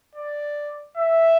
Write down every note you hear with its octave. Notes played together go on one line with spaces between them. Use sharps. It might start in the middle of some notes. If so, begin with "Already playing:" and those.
D5
E5